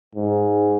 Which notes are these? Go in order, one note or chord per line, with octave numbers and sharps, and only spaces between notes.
G#2